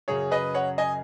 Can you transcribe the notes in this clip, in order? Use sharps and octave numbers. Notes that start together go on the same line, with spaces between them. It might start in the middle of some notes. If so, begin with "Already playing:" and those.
F#2 C#3 F#3 G#4 C#5
B4 D#5
C#5 F#5
D#5 G#5